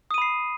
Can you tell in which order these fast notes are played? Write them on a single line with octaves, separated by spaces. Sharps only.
D#6 D#7 B5 C7